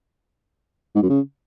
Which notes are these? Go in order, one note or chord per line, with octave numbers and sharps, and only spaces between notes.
G#2
F#2
C#3